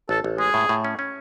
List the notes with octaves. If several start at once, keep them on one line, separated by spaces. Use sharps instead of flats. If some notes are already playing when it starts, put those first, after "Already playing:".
A1 A4
A1
G#3 G#4
A2
A2
C#4
C#4